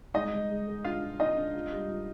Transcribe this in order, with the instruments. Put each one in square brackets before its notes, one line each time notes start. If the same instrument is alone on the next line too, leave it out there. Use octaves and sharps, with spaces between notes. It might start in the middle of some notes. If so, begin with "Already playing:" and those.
[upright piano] G#3 [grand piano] D#4 D#5
[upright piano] G#3
G#3
G#4
[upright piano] D4 [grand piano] F4 F5
[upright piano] F4
[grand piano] D#4 D#5 [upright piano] F4
[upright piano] D4
F4
G3
F4